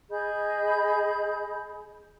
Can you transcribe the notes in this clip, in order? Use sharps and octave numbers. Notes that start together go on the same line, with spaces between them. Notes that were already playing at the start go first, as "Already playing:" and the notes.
G#4 D#5 B5 G6